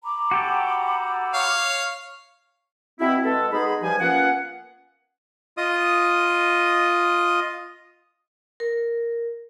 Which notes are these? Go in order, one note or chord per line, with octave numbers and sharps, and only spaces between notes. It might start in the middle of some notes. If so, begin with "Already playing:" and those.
A#5 B5 D6
F#4 G4 A4
C#5 F5
B2 C4 E4
B2 G#3 A4
G#3 B3 D#4 G#4 B5
G2 F3 G#5
A#3 B3 C#4 F4 G#4 F#5
F4 D#5 D#6
A#4